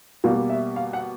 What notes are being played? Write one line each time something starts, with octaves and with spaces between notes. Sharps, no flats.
B2 G3 A#3 F5
E5
F5
F#5